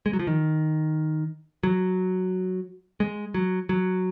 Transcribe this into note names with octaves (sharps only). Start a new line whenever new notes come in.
G#3
F#3
F3
D#3
F#3
G#3
F#3
F#3